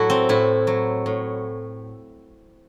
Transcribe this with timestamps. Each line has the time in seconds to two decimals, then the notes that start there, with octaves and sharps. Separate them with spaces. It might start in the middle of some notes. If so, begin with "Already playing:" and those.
Already playing: A2 F#3 E4 F#4 A4
0.10 C4
0.29 A2 E4
0.67 F#3
1.06 A2